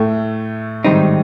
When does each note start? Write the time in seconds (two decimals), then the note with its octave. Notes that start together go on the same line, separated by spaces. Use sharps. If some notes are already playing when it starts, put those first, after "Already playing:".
Already playing: A2 A3
0.84 G#2 D#3 G3 C4 D#4